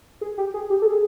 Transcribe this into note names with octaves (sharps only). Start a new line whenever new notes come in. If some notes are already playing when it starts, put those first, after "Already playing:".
G#4
G4
G#4
G4
A4
G#4